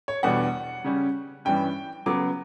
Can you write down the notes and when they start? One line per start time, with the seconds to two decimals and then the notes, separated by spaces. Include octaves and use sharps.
0.08 C#5
0.23 E2 B2 G3 B3 D4 F#5
0.84 C#3 G3 C#4
1.45 G2 E3 G3 C#4 G5
2.06 C#3 F#3 B3 D6